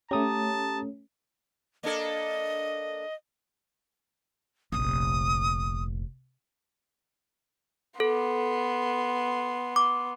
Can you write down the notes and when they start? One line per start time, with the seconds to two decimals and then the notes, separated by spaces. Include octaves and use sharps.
0.11 A3 C#4 G4 A5 A#5 D#6
1.83 A#3 D4 A4 D#5
4.72 F1 A#1 D#6
8.00 B3 A4 C6
9.76 D6